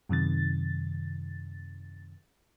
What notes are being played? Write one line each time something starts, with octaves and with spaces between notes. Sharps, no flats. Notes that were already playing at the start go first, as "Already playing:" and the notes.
F#2 C3 D#3 A6